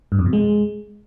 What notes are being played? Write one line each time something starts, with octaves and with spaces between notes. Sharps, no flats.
G2
F2
B2
G#3